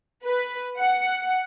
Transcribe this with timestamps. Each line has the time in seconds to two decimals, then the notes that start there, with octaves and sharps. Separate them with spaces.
0.23 B4
0.79 F#5